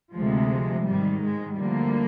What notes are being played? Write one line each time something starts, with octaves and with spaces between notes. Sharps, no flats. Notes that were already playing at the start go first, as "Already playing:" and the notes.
D2 C3 F3 G#3
G#2 D#3 G3
G#3
D2 D3 F3 G3 A#3